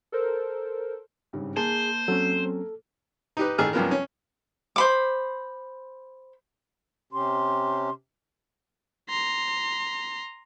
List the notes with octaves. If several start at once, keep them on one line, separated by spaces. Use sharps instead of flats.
A4 A#4 C5
G#1 G2 C#3
A#3 G#4 C5 A5
F#3 C4 C#4 A4
D#4 G4 B4
A1 D#3 G#4 A4 F6
C2 F#2 F3 B3 A#4
C#4
C5 B5 D6
C3 C#4 G4 C6
A#5 C6